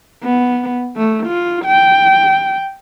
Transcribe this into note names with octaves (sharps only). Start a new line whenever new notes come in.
B3
A3
F4
G5